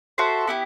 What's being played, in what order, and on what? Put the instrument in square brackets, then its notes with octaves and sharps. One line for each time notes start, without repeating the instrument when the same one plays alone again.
[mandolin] F#4 A4 C5 E5
B3 E4 G4